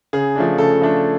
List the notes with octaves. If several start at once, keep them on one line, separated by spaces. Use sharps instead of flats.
C#3 G#4
F3 A3 D4
C#3 A4
F3 A3 D4